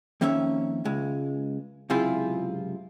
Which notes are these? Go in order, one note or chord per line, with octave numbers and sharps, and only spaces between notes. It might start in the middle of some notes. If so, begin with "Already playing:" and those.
F2 D#3 A#3 C#4 C#5 E5
C#2 G#3
C#2 F#2 C3 E4 F4 G#4